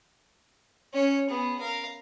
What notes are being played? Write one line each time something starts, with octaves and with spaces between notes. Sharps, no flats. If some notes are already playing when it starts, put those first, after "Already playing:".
C#4 C#5
B3 G#4
A#4 F5